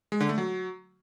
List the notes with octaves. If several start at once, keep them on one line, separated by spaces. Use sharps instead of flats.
G#3
D3
A3
F#3